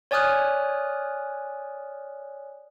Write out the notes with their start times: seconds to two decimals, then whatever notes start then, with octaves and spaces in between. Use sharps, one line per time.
0.11 C#5 D5 G#5 D#6 F6 F#6